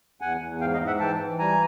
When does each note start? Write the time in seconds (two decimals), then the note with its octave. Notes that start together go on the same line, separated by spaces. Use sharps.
0.21 E2 F#5 G#5
0.41 E2
0.61 G#2 F5 G5
0.73 D#5 F5
0.80 G#2
0.87 E5 F#5
1.00 E3 G5 A5
1.20 E3
1.39 G3 G#5 A#5